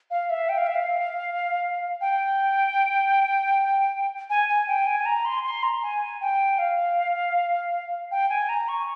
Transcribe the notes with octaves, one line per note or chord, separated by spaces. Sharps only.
F5
E5
G5
F5
E5
F5
G5
G#5
G#5
G5
G#5
A#5
C6
C6
A#5
G#5
G5
F5
G5
G#5
A#5
C#6